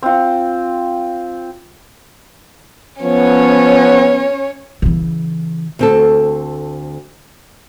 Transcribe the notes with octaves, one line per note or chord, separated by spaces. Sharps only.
C4 F4
F3 B3 C#4 C#5
C#3 E3
D2 C4 A4